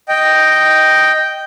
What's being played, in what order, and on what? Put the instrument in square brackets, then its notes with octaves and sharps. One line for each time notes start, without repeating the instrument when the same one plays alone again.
[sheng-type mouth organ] D#5 G5